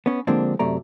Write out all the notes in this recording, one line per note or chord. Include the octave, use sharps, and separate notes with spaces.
B3 C#4
D3 F3 G#3 A#3 C4 D4
F#2 C3 A3 D5 A#5